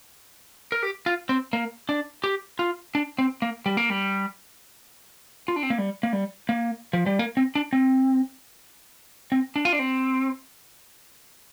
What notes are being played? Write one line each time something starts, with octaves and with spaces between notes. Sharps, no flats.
A#4
G4
F4
C4
A#3
D4
G4
F4
D4
C4
A#3
G3
A#3
G3
F4
D4
C4
A#3
G3
A#3
G3
A#3
F3
G3
A#3
C4
D4
C4
C4
D4
F4
D4
C4